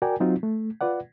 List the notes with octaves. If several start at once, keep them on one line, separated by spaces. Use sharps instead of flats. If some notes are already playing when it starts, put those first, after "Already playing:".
F#4 A#4 D5 G5 G#5
F#3 C4 D#4 F4 F#4
A3
F4 B4 D5 F#5